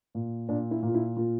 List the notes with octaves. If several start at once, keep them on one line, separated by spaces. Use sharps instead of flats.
A#2
A#2 D4
E4
A#2 F4
E4
A#2 F4